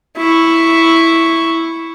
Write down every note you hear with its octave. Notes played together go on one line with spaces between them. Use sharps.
E4 C#6